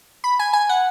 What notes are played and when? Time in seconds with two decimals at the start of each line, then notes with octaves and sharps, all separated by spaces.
0.24 B5
0.39 G#5
0.53 G#5
0.69 F#5